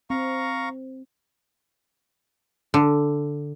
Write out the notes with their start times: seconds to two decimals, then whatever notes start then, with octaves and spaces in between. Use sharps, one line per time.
0.10 C4 F5 A#5 C#6
2.74 D3